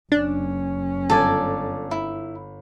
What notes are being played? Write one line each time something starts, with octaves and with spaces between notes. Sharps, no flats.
F#1 C#4 D4
G1 A4 D5 G#5
E4